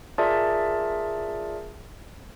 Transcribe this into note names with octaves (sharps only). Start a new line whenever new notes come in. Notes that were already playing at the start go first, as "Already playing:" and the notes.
F4 G#4 A#4 D5 E5 A5